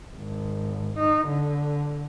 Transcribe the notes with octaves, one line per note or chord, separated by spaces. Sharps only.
G#1
D#4
D3